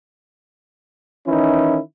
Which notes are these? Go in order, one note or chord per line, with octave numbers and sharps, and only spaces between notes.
D#3 E3 C#4 D#4 E4